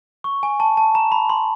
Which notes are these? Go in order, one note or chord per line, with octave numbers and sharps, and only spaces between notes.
C#6
G#5
A5
A5
A#5
B5
C6